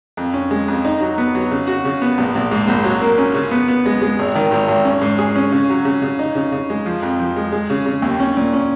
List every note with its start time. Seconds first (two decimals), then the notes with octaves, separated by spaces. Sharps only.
0.17 F2
0.34 C#4
0.51 G#3
0.68 F2
0.85 D#4
1.01 F#3
1.18 B3
1.35 F#3
1.51 C#3
1.67 F#4
1.85 C#3
2.02 B3
2.18 A#1
2.35 A#1
2.51 G#2
2.68 A#1
2.84 F#3
3.01 A#3
3.18 C#4
3.34 C#3
3.51 B3
3.68 B3
3.86 G#3
4.02 G#3
4.19 G#1
4.35 D#3
4.51 G#1
4.68 G#1
4.85 C#4
5.02 G#2
5.19 G#4
5.36 C#4
5.52 C#3
5.70 F#3
5.85 C#3
6.02 C#3
6.19 D#4
6.35 C#3
6.52 C#3
6.70 G#3
6.86 F3
7.03 F2
7.19 F3
7.36 G#3
7.52 G#3
7.70 C#3
7.86 C#3
8.02 D#2
8.20 C#4
8.37 A#2
8.53 C#4